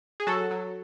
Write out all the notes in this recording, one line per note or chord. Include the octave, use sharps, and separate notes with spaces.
G#4
F#3 F#4 A4
F#3